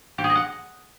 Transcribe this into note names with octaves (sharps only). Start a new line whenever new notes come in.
G4
G#4
D#5
F#5